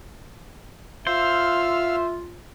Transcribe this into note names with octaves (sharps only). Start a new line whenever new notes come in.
F4 C5 E5 F5 E6 F6